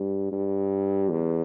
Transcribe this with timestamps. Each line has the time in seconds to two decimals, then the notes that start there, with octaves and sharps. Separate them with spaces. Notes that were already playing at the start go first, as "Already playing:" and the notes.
Already playing: G2
0.32 G2
1.09 E2